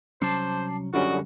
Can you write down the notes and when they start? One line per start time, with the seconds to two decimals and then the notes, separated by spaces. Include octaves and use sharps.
0.22 C2 F#3 C#4 C5 A5 D6 C7
0.94 F#2 D3 G3 C#4 F4 F#4 D5 D#5